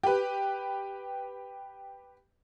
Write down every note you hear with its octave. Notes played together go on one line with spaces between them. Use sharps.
G4 B4